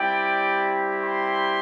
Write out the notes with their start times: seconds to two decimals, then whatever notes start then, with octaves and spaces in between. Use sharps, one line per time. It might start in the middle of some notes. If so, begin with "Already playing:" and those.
Already playing: G3 C4 E4 G4 D5 G5
1.02 G5 C6